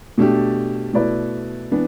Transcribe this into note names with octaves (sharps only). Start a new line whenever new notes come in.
B2 A3 D4 G4
B2 A3 E4 B4 D5
E3 B3 D4